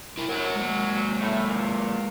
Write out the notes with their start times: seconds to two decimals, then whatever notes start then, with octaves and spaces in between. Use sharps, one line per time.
0.17 E4 A#4
0.29 F#2 C3 F#3 A#4 C#5
0.56 G#3 A#3
1.21 A2 A3
1.47 E2 A#2